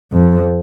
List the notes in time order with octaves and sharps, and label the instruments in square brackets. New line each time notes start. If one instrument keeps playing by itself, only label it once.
[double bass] F2